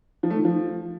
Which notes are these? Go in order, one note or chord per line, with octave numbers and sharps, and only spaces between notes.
F3
A3
D#3
F3